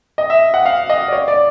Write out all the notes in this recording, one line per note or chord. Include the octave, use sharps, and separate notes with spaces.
D#5
E5
F#5
F5
D#5
D5
C#5
D5